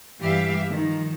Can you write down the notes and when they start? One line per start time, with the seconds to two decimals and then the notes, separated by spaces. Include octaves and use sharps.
0.20 G2 E3 G3 G4 E5 F5
0.70 D#3 F3